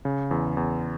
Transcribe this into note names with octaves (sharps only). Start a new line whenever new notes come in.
C#3
E2
E2